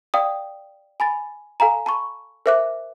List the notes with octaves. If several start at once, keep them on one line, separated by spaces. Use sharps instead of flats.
D5 F5 G5 D#6
G#5 B5 A6
A4 F5 G#5 A#5
A5 B5 C#6
A#4 C5 E5 D6 F#6